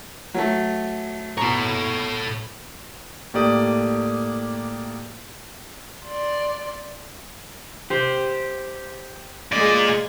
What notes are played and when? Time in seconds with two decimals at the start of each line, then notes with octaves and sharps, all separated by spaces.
0.34 F#3 A3
1.37 B2 A4 C#5 A#5
3.34 A2 A#3 G4 D5 D#6
6.05 D5 C6
7.90 G4 C5
9.52 A#2 G#3 G#4 D5